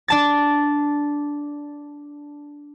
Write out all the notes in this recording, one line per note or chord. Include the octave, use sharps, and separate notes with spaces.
D4 A5 A6